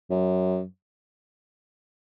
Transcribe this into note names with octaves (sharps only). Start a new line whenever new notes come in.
F#2